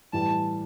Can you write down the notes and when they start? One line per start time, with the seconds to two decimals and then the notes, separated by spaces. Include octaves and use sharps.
0.13 A2 E3 G3 A5